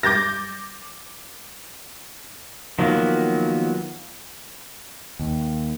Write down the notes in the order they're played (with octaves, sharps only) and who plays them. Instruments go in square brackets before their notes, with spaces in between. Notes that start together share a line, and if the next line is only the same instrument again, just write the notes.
[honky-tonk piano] D6 G6 A6 A#6
[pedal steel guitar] D#3 F3 F#3 A#3 B3
[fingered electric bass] D#2